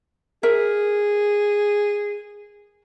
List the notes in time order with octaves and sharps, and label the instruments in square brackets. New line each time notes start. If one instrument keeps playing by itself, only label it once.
[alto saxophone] G#4 [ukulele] A#4 E5